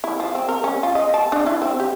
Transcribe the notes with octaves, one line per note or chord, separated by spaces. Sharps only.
E4
F3
C4
A#4
C#4
F4
D#5
A5
D4
E4
C4
G4